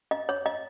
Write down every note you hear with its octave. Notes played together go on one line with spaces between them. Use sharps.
D#5
C#5
D#5